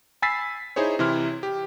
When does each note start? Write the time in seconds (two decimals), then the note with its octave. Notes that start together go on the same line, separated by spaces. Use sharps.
0.22 G#5 B5 E6 A6 B6 C7
0.76 D#4 E4 G#4 C5 C#5
0.99 C3 E3 E4 C6 F6
1.43 G4